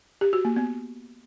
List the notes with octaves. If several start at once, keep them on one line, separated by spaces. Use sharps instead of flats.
G4
F#4
A#3
B3